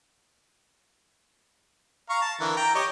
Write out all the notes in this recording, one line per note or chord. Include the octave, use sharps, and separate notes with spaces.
F5 A#5 C#6
A5
D3 E3 A#4
G5 A#5
G4 C#5 D#5